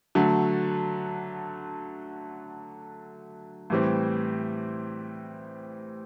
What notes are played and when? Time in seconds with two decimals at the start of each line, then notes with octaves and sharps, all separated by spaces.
0.15 D3 F#3 A3
3.70 A2 E3 G3 C4